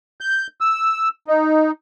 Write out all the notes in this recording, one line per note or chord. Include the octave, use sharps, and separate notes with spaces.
G6
E6
D#4